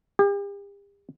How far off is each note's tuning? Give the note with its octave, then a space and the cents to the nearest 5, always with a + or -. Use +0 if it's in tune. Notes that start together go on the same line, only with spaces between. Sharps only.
G4 +40